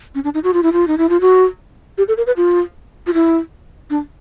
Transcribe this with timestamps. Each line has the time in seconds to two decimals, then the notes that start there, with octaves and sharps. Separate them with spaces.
0.15 C#4
0.24 D4
0.34 D#4
0.44 F#4
0.53 F4
0.63 E4
0.73 F4
0.88 D#4
0.98 E4
1.09 F4
1.21 F#4
1.98 G4
2.08 A4
2.17 A#4
2.27 B4
2.37 F4
3.07 F4
3.14 E4
3.90 D4